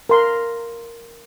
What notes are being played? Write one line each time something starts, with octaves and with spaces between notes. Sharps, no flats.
A#4 C6